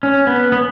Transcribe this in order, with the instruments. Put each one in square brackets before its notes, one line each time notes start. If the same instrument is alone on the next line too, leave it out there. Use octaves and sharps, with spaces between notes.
[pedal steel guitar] C#4
B3
B3